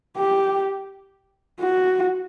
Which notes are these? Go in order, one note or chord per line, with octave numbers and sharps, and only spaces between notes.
G4
F#4